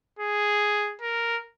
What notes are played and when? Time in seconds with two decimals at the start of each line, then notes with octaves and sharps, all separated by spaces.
0.19 G#4
1.01 A#4